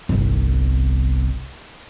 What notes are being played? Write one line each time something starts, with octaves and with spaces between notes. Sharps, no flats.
G1 C2